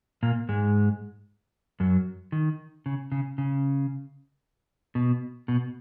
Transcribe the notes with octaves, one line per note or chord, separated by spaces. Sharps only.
A#2 A#3
G#2 G#3
F#2 F#3
D#3
C#3
C#3
C#3
B2
B2